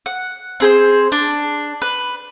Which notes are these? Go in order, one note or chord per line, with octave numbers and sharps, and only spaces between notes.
F#5
C4 G#4 C5
D4
B4